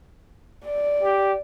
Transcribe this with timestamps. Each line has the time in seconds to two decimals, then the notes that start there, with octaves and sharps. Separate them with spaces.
0.66 D5
1.03 G4